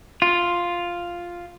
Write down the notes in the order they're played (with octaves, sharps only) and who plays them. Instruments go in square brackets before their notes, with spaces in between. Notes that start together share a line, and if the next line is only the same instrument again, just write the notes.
[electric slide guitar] F4